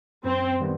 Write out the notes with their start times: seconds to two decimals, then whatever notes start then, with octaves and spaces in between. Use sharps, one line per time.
0.24 F#2 C4
0.60 D#3 G3 B3